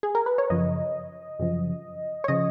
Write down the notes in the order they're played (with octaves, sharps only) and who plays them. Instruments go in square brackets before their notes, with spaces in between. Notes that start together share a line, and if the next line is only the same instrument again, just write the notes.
[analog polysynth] G#4
A#4
B4
C#5
F#2 C#3 F3 D#5
F#2 C#3 F3
C#5
C#3 F3 D#5